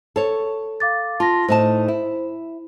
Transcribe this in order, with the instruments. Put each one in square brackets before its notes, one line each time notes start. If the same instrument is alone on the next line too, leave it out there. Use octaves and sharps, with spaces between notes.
[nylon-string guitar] A4 C#5
[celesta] F5 D6 A6
[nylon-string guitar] F4 [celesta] A5 A#6
[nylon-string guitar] A2 D#4 A5 [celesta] C5
[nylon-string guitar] E4